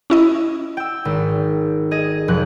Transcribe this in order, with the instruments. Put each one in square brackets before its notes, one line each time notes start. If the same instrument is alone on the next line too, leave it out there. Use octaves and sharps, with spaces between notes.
[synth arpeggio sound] C#4 E4 D#5
[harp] G5 E6
G#1
G#4 D#5
F1 F3 F#6